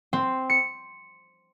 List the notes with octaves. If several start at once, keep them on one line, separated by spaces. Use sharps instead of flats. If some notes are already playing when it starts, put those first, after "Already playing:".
C4
C#7